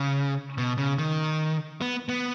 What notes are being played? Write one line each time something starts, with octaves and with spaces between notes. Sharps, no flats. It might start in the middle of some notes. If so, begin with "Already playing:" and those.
Already playing: C#3
B2
C#3
D#3
B3
B3